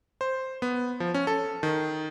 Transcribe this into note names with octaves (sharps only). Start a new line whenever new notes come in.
C5
B3
F3
C#4
A4
D#3